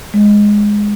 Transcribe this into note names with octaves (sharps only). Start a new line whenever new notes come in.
G#3